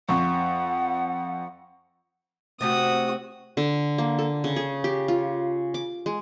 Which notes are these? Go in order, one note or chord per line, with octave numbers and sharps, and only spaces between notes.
F2 F#5 C#6
C3 A3 C4 F#4 D#6
D3
A#3
A4
C#3
G#4
G4
F4
D6
G#3